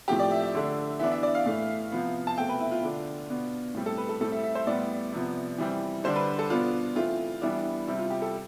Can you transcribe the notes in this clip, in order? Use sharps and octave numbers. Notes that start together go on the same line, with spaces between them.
A2 F3 A3 C4 G4
D5
E5
E5
D3 A3 D4
E3 B3 D4 E5
E5
D5
F5
A2 E3 A3
C3 F3 B3
A5
B2 A3 C4 G5
B4
E4
F4
D3 A3 D4
B2 B3 D4
A2 G3 C4
A4
B4
A4
A2 G3 C4 A4
E5
E5
C5
A2 G3 B3 D5
C3 F3 B3
E3 G3 C4
D3 G3 D4 C5
B4
A4
B2 B3 D4 F4
E3 A3 C4 F4
E3 G3 B3 D4 E4
C3 G3 C4 E4
F4
G4
A4